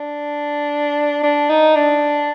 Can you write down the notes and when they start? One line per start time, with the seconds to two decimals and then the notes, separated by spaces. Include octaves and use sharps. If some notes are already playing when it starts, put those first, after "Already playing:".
Already playing: D4
1.23 D4
1.49 D#4
1.76 D4